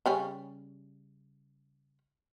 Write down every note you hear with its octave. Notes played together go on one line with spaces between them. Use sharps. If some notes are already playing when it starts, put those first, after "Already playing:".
C#3 G3 C#4